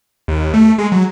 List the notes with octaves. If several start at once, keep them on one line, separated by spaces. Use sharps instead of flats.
D#2
A3
G#3
F#3